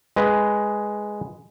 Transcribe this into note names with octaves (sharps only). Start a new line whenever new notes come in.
G#3 B4